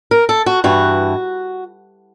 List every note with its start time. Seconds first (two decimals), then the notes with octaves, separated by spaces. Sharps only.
0.11 A#4
0.29 A4
0.46 F#4
0.64 G2 E3 F#4